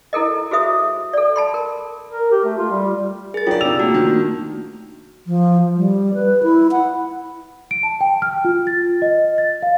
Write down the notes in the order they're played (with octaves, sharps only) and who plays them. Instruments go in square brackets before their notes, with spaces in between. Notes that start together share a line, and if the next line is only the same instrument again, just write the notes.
[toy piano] E4 A4 A#4 D#5
F#4 G#4 C5 E5 D#6
A4 D5
A5 B5 C6
A#4
[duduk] A#4
G4
A3
F4
G3
[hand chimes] G#4 A6 [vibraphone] A#4
[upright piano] F#3 D5 [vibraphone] D4 D#4 G5 [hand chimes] F4
[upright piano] C3 F7 [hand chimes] E6
[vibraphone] A3 A#3 D4 [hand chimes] F#4
[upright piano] D#3
[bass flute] F3
G3
B4
E4
F#5
[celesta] D7
A5
G5
F6
F4
A6
D#5
A6
F5